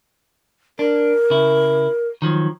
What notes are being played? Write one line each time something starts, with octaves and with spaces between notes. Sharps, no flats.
D4 A#4
C#3 E4
D#3 F3 F#3